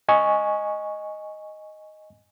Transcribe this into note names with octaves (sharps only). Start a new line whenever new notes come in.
D#5 G#5 C#6